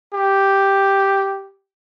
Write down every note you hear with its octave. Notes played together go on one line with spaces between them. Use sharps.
G4